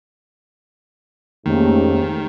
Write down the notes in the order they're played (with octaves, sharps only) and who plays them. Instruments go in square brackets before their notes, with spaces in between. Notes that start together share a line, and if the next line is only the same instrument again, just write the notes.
[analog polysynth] F2 A3 A#3 [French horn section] G#2 C#4 G4 [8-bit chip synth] D#3